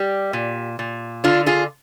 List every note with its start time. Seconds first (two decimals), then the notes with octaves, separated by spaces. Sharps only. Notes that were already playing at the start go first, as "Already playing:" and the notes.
Already playing: G3 G4
0.33 A#2
0.79 A#2
1.24 D3 D4 F4
1.46 F4 G#4